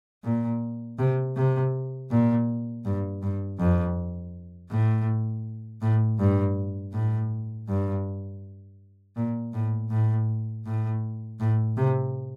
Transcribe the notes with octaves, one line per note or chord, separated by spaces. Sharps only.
A#2
C3
C3
A#2
G2
G2
F2
A2
A2
G2
A2
G2
A#2
A2
A2
A2
A2
C3